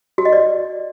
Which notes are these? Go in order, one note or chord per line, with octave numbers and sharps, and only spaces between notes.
F#4
D#5
D5